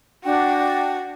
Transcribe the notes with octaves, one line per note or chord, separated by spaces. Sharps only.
D4 F#4 G5